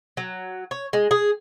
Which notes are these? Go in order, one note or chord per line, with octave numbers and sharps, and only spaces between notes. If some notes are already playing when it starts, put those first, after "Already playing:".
F#3
C#5
G#3
G#4